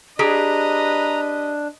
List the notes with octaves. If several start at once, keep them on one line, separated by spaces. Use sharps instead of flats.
D4 G4 G#4 B4 D#5 A#5